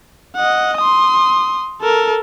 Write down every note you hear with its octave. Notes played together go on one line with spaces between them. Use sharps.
D#5 F#5
C6 D#6
A4 A#4